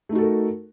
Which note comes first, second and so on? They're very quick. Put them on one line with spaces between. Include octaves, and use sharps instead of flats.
A3 D#4 F#4 A4 A#4